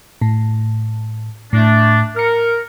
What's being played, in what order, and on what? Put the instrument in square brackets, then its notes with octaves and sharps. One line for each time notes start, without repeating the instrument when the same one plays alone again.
[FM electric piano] A2
[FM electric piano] A2 [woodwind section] A3 D4
[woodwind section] A#4 [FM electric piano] F6 C#7